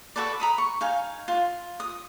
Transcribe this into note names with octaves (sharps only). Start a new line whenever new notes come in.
F#4 A4 B4 D5
A#5 B5 D#6
C#6
D#4 F5 G#5
F4
D#6